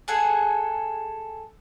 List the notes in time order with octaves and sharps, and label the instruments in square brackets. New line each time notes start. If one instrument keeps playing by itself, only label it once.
[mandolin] G#4 A4 F#5 G#5